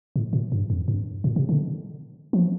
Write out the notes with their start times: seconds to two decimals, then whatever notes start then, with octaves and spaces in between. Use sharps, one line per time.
0.16 A2
0.33 A#2
0.52 G2
0.70 F2
0.88 G2
1.24 A#2
1.36 C3
1.49 D3
2.33 F3